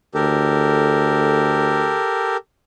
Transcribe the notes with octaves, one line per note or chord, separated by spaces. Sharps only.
D2 G4 A4 A#4